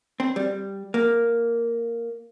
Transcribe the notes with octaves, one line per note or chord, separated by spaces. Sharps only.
C4
G3
A#3